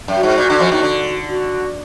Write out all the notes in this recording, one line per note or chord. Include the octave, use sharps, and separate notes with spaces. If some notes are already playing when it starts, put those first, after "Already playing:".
F#2
F#4
G#2
A#2
D3
F2 F3
D#2 D#3
D3
F#4